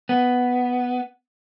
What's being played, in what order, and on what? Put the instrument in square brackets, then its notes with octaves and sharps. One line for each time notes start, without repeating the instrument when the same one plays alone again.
[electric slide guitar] B3